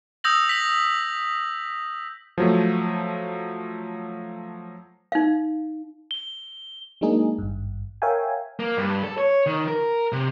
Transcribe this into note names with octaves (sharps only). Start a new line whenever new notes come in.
D#6 E6 G6 A#6 F#7
B6 F#7
F3 F#3 A3
D#4 F5
G7
F#3 G#3 A#3 D4 D#4 G#4
G#1 G2
A#4 C#5 E5 F5 G5 G#5
A#3
G2
A4
C#5
D#3
A#4
C3